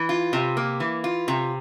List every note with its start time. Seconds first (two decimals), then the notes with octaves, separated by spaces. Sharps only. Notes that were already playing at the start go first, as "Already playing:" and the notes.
Already playing: E3
0.09 F4
0.33 C3
0.57 A#3
0.80 E3
1.04 F4
1.28 C3